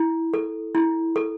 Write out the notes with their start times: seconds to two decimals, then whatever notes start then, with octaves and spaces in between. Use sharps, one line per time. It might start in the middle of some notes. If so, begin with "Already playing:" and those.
Already playing: E4
0.34 A4
0.75 E4
1.16 A4